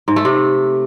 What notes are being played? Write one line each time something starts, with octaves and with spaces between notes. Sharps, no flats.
G#2
A3
C3